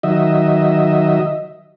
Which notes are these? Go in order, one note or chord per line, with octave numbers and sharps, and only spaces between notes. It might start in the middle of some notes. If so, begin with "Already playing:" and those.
D#3 F#3 D#5 E5